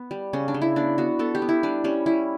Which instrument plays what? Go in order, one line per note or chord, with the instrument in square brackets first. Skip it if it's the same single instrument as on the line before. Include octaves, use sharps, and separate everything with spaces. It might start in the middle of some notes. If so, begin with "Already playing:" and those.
Already playing: [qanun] B3
G3
C#3 C#4
D4
C#3
E4
B3 D4
B3 F#4
B3 A4
G4
B3
E4
G3 D4
G3 C#4
G3 E4